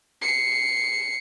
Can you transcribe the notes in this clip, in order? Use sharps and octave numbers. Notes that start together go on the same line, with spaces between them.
C7 C#7